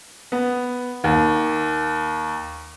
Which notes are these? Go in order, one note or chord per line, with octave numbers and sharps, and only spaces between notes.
B3
D#2